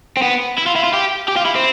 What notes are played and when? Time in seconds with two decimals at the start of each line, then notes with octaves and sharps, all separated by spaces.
0.17 C4
0.22 B3
0.58 E4
0.66 F4
0.76 E4
0.84 F4
0.94 G4
1.28 G4
1.37 F4
1.46 E4
1.56 C4